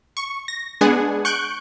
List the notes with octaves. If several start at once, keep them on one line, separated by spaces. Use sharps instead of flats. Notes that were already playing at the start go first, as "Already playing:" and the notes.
C#6
A#6
G#3 B3 D4 G#4 F#5 G#5
C#6 F#6 G6 D7